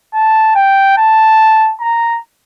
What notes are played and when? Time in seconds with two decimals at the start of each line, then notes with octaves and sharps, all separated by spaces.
0.13 A5
0.55 G5
0.97 A5
1.81 A#5